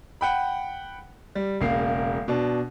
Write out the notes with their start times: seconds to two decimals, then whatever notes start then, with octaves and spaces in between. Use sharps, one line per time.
0.21 F#5 G5 B5
1.35 G3
1.60 E1 C#3 A#3 C7
2.28 B2 D4